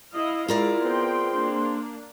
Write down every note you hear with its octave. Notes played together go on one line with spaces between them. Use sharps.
E4 D#5 F5
G#3 E4 F4 A#4 D5
B3 C4 G#4 G5 C6
A#3 D4